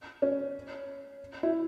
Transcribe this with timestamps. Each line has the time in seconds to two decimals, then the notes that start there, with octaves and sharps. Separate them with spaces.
0.22 C#4
1.43 E4